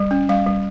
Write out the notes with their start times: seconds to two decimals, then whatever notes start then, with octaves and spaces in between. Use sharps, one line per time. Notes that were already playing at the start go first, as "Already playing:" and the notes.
Already playing: G3
0.11 C#4
0.29 G3 F5
0.46 G3